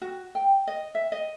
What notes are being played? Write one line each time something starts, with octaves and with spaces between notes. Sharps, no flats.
F#4
G5
D#5
E5
D#5